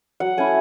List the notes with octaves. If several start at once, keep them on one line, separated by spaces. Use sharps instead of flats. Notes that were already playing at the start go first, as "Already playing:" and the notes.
F#3 F#5
A3 C#4 E4 G#5